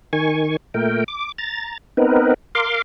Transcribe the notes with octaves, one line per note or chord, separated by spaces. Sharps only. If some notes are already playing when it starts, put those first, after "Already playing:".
D#3 G#5 C#6
A#2 A3 A#4 G5
D6
A#5 A6
B3 C4 D#4 A#4 B4
A#4 F5 C6 D6